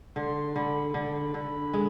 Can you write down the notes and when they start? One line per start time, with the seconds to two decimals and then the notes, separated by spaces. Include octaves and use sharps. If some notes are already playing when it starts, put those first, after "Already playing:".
0.16 D3 C6
0.55 D3 B5
0.94 D3 B5
1.34 D3
1.74 G#3